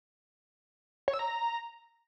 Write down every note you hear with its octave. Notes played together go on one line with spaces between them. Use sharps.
C#5
E6
A#5